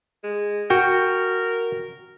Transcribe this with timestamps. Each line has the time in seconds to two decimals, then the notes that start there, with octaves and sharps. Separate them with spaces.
0.24 G#3
0.70 F#4 A#4 G5